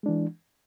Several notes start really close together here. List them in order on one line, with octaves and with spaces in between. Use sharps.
G#3 D4 E3